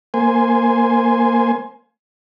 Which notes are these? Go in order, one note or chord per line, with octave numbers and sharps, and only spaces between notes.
A#3 C5 G#5